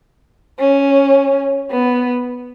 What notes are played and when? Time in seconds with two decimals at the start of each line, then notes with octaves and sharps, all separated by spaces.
0.59 C#4
1.71 B3